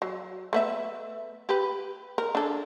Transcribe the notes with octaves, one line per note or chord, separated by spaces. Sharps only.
F#3
A3 B3 E5
G4 B4
A#4
D4 G#4 A4